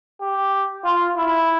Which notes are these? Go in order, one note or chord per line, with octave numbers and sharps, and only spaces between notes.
G4
F4
E4